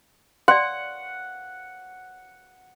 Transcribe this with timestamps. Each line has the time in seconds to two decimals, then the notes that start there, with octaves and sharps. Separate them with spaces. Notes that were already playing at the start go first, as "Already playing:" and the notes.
0.48 D5 F#5 C6